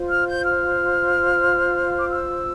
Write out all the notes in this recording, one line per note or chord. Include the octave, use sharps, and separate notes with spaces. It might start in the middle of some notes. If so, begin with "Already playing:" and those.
Already playing: F4 C5
F6
G6
F6
D6
E6